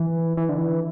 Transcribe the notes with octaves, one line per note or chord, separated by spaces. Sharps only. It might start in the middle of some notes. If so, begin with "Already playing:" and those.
Already playing: E3
E3
D3
E3